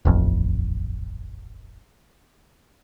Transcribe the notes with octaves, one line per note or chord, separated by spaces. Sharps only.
D#1 A1 F2